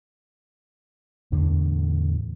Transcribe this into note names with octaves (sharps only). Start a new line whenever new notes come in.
E2 A2 D3